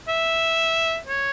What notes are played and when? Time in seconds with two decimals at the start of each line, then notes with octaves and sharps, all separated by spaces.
0.08 E5
1.07 C#5